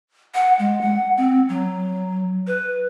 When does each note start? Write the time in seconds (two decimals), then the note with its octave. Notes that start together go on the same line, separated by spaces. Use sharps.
0.34 F#5
0.59 G#3
0.81 F#5
1.17 C4
1.49 F#3
2.47 B4